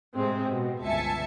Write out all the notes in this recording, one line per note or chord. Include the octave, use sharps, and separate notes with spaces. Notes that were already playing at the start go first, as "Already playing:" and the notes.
A2 C3 G#3 C4
B2
G1 C#2 E5 G#5 A5 C#7